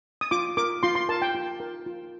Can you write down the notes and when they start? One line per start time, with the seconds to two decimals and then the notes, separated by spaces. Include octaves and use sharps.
0.21 D#6
0.31 F4 D6
0.57 A#4 D6
0.83 F4 C6
0.95 C6
1.09 A#4 A5
1.22 G5
1.35 F4
1.60 A#4
1.86 F4